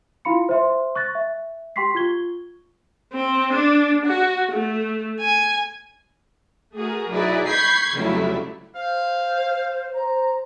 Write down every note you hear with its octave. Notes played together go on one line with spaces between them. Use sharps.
E4 F4 F5 B5 C6 C#7
C5 E5 C6
C#6 F#6 A6 A#6
E5
G4 G5 C6 C#6 B6 C7
F4 C#6 G#6 G7
C4
D4
F#4
A3
G#5
A3 F#4 G#4 A#4
F#3 D#4 E4 G#4 B4 D5
B5 C#6 G6 G#6 B6 C7
F2 C#3 F#3 G3 A3 E4
C5 F5
C5 A#5